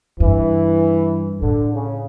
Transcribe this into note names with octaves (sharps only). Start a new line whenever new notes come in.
G2 E3
A2 D3
C#3